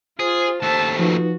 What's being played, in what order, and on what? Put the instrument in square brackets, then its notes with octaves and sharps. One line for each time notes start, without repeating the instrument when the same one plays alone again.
[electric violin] F4 [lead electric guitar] G#4 [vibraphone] C5
[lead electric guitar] D#2 A3 [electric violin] A5
[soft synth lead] F3 [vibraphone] D#4 B4 [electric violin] F#4